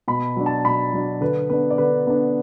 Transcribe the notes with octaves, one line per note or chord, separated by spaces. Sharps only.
B2 B5
F#3 D4
A5
B2 B5
F#3 D4
D3 B4
B3 D4 B4
D5
D3 B4
B3 D4